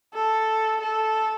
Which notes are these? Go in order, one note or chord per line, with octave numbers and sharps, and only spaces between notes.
A4
A4